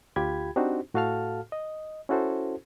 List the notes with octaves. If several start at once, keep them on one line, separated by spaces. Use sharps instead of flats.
D2 F4 G4 G5 B5 G#6
C4 D4 D#4 F#4 G4 C5
A2 F#4 A4 F5 A5 F6
D#5
C#4 E4 F#4 A4 C5